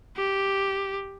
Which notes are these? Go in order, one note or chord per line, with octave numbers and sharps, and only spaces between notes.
G4